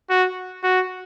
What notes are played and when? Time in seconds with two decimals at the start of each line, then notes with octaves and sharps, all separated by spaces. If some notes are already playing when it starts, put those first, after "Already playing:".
0.10 F#4
0.64 F#4